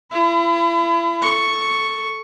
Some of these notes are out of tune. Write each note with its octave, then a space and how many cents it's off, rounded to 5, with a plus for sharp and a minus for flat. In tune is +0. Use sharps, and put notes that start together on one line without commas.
E4 +40 B5 +30
A4 +0 C#6 +0